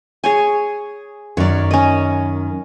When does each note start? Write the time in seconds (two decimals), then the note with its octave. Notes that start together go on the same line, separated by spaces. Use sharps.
0.24 G#4 C#5 G#5
1.37 F#2 D#3 C#5 D5
1.71 C#4 D#5